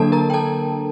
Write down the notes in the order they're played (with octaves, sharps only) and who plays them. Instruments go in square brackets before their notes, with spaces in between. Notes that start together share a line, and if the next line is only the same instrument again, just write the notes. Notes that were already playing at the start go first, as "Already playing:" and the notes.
Already playing: [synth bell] D3 F#3 A#3 D4 A4 A5
A#4 A#5
G5
A4 A5